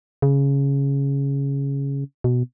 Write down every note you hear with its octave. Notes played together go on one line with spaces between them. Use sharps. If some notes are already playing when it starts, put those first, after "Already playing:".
C#3
B2